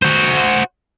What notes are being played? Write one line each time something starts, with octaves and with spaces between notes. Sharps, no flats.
F#4 C5